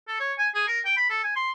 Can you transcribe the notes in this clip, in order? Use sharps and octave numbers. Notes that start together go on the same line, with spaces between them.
A4
C#5
G#5
G#4
A#4
G5
B5
A4
G#5
C6